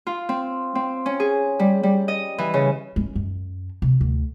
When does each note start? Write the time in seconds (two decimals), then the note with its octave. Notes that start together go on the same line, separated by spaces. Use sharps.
0.07 F4
0.29 C4
0.75 C4
1.06 C#4
1.20 G#4
1.59 G3
1.83 G3
2.08 D#5
2.38 E3
2.54 C#3
2.96 G#3 C#4
3.15 F#2
3.82 C3
4.01 D2